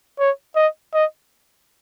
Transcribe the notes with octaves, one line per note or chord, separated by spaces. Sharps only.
C#5
D#5
D#5